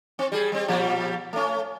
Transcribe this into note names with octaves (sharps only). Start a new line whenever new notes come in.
C4
G3 G#4
G3 C4
A#2 F3 G3
A3 C#4